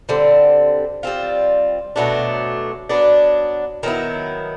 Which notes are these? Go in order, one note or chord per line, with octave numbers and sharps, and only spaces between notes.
D3 G3 C4
G3 C4 F4
B2 F#3 A3 D4
F#3 B3 D4
D#3 F#3 B3 E4